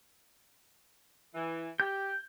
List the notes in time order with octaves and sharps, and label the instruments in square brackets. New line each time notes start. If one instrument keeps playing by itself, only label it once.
[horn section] E3
[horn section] G4 [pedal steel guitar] G6